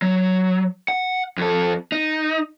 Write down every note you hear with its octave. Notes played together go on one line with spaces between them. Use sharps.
F#3
F#5
F2 A4
D#4